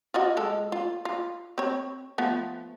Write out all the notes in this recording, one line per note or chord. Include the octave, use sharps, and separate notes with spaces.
F4 F#4 D#5
G#3 A4
F4
F4
C4 C#5
F3 A3 B3